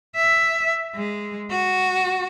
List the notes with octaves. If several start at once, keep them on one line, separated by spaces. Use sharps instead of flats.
E5
G#3
F#4